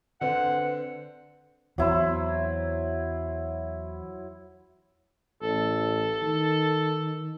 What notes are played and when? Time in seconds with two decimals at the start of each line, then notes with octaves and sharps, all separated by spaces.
0.21 D3 C4 B4 F#5
1.78 E2 F#3 C4 E4 C5
5.42 A1 A4
6.22 D#3